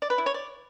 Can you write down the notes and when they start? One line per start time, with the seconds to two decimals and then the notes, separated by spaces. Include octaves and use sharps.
0.02 D5
0.10 B4
0.18 E4
0.26 C#5
0.34 D5